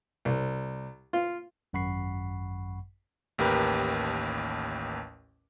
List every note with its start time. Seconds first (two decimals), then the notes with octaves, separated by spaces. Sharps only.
0.25 C2
1.13 F4
1.73 G#1 F#2 F#5 B5 C#6 C7
3.38 A1 D#2 G4 A#4 B4